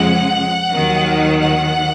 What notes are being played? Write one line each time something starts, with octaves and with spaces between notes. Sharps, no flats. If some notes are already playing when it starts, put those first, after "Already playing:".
Already playing: F2 C#3 F3 G#3 F#5
D#2 D#3 F#3
F#5